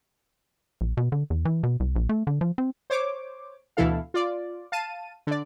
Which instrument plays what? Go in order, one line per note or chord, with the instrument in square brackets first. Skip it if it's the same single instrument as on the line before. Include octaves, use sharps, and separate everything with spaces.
[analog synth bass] A#1
B2
D3
E2
E3
B2
C2
A#1
A3
D3
F3
C4
[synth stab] C5 C#5 D6
D2 B2 E3 E4 A4 F5
F4 D5
F5 A5 D#7
D3 D5